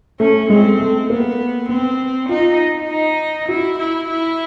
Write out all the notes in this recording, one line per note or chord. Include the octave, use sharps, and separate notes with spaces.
A3 C#4
G#3 C4
A3
A#3 B3
B3 C4
D#4 F4
D#4
E4 F#4
E4
E4